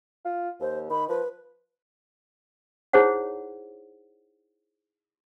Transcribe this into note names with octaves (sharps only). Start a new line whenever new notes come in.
F4
D#2 C5
D#3 B5
F3 B4
D#4 E4 G#4 C5 C#5 F#5